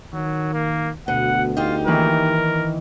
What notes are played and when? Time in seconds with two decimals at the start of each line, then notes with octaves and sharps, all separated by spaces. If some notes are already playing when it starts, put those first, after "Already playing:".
0.14 D#3 F#3
0.53 A#3
1.08 D2 B2 F#5
1.57 D#4 F4 G4
1.87 D#3 E3 A#3 A#4